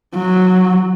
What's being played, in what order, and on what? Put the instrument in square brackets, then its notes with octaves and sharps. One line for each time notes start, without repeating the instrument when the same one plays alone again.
[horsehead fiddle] F#3